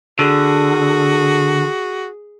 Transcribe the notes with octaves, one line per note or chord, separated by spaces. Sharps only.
D3 F#4 G#4